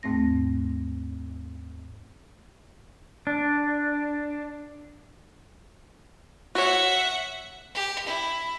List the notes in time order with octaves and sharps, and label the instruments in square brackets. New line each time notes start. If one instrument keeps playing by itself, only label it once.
[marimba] D#2 G#2 A3 C4 A#6
[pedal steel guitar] D4
[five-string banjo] F#4 C#5 [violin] E5 F#5
[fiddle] G4
E4